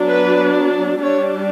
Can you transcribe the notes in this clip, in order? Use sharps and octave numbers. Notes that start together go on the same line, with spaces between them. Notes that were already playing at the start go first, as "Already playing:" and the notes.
Already playing: F#3 B3 D4
B4
G3 D4 C#5